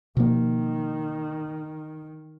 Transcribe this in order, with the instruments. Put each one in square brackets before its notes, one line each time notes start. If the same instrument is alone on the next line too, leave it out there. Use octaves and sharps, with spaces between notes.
[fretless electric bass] B2 F3 A#3 [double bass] D#3